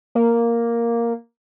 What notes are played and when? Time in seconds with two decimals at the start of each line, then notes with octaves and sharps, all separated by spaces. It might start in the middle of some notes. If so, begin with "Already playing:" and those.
0.15 A#3